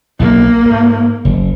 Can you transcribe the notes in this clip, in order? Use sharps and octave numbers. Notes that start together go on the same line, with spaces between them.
B1 A#3
G#2
F#1